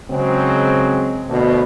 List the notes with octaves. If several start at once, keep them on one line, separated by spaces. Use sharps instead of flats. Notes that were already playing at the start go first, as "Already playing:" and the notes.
C#3 F#3 G#3 C4
D2 B2